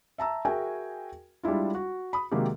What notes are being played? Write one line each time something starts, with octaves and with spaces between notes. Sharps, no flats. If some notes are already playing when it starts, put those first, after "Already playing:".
E5 A5 A#5 E6
F#4 G#4 A#4 E5 G5 G#5
G3 G#3 D4 E4 F4
F#4
B5 D#6
C3 D#3 F#3 G#3 A#3 G4